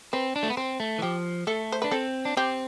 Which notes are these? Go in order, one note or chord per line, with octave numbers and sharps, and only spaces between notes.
C4 B4
D4
A3
B3
C4 C5
A3
E3
F3 G4
A3 A4
C5
D4 B4
C4 A4
D4
C4 G4